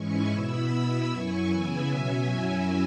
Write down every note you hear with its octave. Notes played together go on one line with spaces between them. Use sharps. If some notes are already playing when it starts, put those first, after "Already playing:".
Already playing: G#2 E3 G#3 C#4 E4 G#5 C#6
B2 B3 E4 B5 E6
B2 B3 E4
F#2 F#3 E4 G#5 C#6
C#3 E3 B3 E4 E5 G#5
B2 F#3 C#4
F#2 F#3 C#4 E4